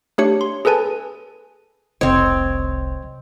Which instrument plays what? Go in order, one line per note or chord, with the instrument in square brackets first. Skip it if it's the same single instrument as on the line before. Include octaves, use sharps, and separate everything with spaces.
[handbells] A3 D4 G4 C#5 C#7
C6
G#4 A4 B4 G#5 A5
[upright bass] F1 C2 [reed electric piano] C3 C5 D#5 [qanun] C4 C#5